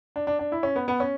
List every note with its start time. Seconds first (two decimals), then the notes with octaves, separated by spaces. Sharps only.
0.16 D4
0.27 D4
0.39 D4
0.52 E4
0.63 C#4
0.76 B3
0.88 B3
1.00 C#4